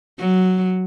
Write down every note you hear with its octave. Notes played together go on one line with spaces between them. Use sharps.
F#3